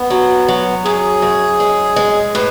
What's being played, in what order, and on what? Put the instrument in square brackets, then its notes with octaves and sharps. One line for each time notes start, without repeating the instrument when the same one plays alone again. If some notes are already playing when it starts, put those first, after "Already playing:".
Already playing: [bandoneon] B3
[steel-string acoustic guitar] F#3
F#3
[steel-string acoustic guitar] F#2 [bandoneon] G#4
[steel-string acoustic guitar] F#2
G#3
G#3
[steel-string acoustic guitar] A2 [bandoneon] B4